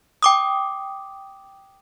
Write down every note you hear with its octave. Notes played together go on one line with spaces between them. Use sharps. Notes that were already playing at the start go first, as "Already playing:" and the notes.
G5 D6 D#6